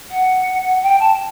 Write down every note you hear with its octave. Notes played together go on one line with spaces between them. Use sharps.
F#5
G5
A5